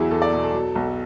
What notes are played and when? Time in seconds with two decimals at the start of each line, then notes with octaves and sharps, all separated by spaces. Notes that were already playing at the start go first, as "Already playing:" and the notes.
Already playing: E2 F#3 E4 G#4
0.11 E2 A4
0.22 D5
0.32 B2
0.43 A4
0.54 F#3
0.75 B1